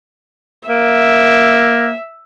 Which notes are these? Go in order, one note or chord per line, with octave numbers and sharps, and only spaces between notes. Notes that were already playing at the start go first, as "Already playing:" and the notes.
A#3 E5